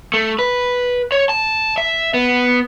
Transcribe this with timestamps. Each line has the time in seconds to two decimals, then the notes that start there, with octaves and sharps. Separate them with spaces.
0.14 A3
0.39 B4
1.12 C#5
1.29 A5
1.78 E5
2.14 B3